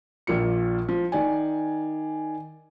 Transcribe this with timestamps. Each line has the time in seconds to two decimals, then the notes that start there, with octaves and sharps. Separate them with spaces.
0.27 A#1 A#2 F4 C#7
0.89 F3
1.12 D#3 D5 G#5